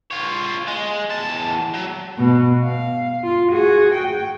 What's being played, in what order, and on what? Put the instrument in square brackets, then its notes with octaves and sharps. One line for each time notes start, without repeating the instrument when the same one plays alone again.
[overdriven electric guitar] F4 C#5
G#3
E2 A5
F#3
[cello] B2
F5
F4
F#4 G#4
G5